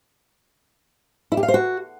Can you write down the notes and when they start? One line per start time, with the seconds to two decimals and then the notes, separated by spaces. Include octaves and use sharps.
1.32 E4
1.37 G4
1.43 F5
1.48 C5
1.54 F#4